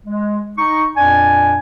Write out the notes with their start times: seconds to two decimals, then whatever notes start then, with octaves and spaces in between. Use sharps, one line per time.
0.06 G#3
0.58 D#4 C#6
0.96 F2 A#2 D4 D5 G#5